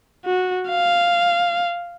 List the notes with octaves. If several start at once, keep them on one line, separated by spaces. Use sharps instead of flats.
F#4
F5